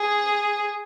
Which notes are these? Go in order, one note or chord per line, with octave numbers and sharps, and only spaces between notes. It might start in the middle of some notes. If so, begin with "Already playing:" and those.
Already playing: G#4